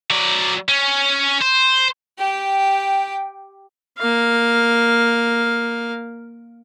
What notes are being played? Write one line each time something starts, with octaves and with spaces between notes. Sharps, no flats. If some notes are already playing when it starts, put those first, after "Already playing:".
F#3 D5
C#4
C5
G4 G5
A#3 F5